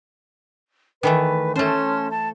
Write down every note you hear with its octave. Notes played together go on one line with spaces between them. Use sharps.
D#3 E3 A3 B4
A3 C#4 C5 A5 C6
A5